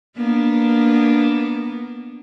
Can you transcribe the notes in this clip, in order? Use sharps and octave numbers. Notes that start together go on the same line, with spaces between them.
A#3 B3 D4